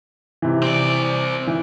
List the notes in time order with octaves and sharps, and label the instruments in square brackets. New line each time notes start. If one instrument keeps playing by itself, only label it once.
[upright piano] C3 E3
[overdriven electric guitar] C4 D5
[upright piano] E3